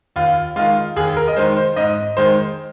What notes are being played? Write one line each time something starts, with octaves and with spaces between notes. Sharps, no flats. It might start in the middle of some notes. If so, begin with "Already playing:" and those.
D#2 F4
D#3 G#3 F4
D#2 G#4
A#4
D#5
D#3 G#3 C5
C5
G#2 D#5
D#3 G#3 C5